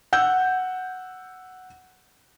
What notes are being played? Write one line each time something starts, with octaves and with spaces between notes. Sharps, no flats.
F#5 E6 G6